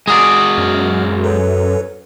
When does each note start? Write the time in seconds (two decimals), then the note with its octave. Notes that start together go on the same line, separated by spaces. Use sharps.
0.07 G#3 F#4 G#4 A#4 D5
0.58 F#2 F6
1.24 A4 B4 C#5